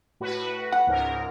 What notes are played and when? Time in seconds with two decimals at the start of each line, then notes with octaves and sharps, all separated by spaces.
0.20 A2 F#4 B4
0.72 F#5
0.87 C#2 G#2 A#4